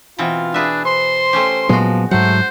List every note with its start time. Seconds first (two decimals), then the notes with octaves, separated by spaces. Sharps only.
0.19 B2 E3 C4 F4
0.54 D4 G#4 B4 E5
0.85 C5 C6
1.33 A3 C#4 G4
1.69 A#2 F3 F#3 G#3 B3 F#4
2.11 G#2 F#3 A3 C5 F#5